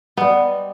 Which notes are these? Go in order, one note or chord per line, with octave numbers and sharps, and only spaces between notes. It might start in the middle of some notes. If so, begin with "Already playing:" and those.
G3 B3 C4 D#4